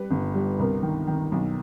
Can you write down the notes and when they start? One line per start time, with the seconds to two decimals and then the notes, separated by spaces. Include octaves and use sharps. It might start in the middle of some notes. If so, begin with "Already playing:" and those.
Already playing: G3 B4
0.10 G1
0.34 G3
0.59 C2 A#4
0.83 D#3
1.07 D#3
1.32 B1